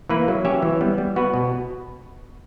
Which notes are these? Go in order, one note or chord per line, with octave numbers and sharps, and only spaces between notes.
E3 A#3 E4 B4
F#3
C#4 G4 C#5 E5
E3
G3 B3
G3
B3 F#4 B4
B2